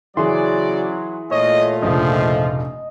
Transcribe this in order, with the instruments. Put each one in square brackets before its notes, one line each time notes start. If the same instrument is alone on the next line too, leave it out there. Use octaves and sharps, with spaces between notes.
[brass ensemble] C#3 F#4 D5 [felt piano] E3 G#4 G#5 [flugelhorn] F#3 [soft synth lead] C6
[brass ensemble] A#2 A3 F4 [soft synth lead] C#5 [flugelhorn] D#5
[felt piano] F1 A#1 C#3 [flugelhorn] F3 [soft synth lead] D#5